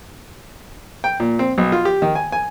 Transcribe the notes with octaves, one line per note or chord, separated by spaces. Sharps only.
G5
A#2
C4
B1
F4
G4
D#3
G#5
G#5